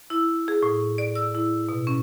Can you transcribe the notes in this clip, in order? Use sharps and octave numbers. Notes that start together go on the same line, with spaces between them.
E4
G#4
A2
D5
E6
E4
B2
C#4